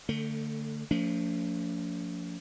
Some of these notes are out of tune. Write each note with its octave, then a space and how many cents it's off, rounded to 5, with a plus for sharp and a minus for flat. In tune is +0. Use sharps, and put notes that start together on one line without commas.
D3 +0 A3 +25
F3 +0 A3 +45 D4 -45